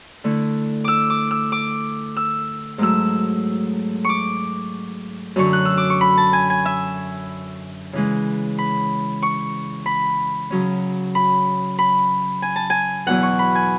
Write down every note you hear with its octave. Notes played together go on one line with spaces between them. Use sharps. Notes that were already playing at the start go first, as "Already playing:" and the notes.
D3 A3 E4
D6 E6
D6
E6
D6
E6
G#2 F#3 A3 E6
C#6 D6
F#2 D3 F#3 C#4 C#6
F#6
E6
D6
C#6
B5
A5
G#5
G#5
E5
C#3 E3 G#3
B5
C#6
B5
C#3 F#3 C#4
B5
B5
G#5
A5
G#5
E2 B2 F#3 B3 E4 F#5
C#6
B5
G#5